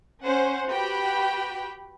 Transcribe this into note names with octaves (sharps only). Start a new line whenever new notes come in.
C#4 C5 F#5
F#4 G4 B4 G5 B5